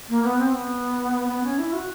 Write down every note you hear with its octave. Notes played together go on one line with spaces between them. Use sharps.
A#3
B3
C4
B3
B3
C#4
E4
F#4